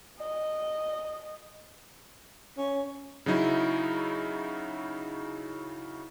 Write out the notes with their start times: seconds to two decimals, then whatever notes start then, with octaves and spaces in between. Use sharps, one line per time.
0.19 D#5
2.57 C#4
3.26 C#3 F#3 D#4 E4